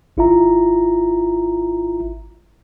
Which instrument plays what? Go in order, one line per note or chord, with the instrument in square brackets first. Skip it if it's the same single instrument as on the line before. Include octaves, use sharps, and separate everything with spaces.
[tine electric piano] G#1 E4 F4 E5 A#5